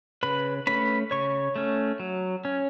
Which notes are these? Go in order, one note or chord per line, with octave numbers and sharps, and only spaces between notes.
C#3 B4 B5
A3 C#4 B4 B5
C#3 C#5 C#6
A3 C#4
F#3
C#4